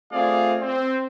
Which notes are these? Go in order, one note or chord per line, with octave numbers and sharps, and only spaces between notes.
A3 C4 F4 G#4 D5 F5
C4